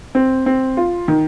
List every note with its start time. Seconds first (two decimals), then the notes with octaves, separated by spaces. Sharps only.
0.15 C4
0.46 C4
0.77 F4
1.08 D#3